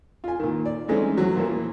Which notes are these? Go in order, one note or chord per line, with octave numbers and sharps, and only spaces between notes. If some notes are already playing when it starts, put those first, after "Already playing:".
F4 G#5
A#2 D#3
D5
E3 G#3 A3 C4 C#4 D#4
E2 F#3
A#2 E3 F3 A#3